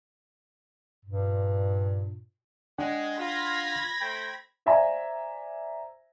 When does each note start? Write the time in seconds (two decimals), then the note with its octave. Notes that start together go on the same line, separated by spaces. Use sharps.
1.04 G2 A#2
2.78 G#3 D4 F#5 G5
3.19 F4 B5 G#6 A#6
4.01 A3 C5 G5
4.66 C5 D5 E5 F5 G#5 A#5